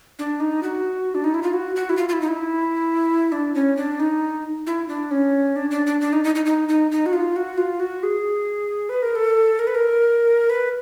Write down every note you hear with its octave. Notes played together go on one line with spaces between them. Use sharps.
D4
D#4
F#4
D4
D#4
E4
F4
F#4
F#4
E4
F4
F4
E4
D#4
E4
D4
C#4
D4
D#4
E4
D4
C#4
D4
D4
D4
D4
D#4
D#4
D#4
D#4
D#4
D#4
F#4
F4
F#4
F4
F#4
G#4
B4
A#4
A4
A#4
B4
A#4
B4